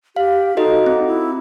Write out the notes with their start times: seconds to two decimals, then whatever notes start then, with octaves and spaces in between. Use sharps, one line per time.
0.16 G4 F5
0.57 D#4 F#4 A4 D#5
0.86 C4
1.07 E4